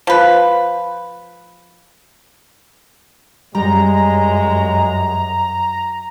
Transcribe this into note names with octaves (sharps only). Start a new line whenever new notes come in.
F3 B4
F#2 G3 G#3 A#5